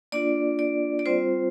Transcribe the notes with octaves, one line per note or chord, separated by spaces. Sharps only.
A#3 D4 F4 D5
D5
D5
G3 C4 F4 C5